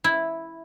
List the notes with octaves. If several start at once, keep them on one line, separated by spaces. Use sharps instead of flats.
E4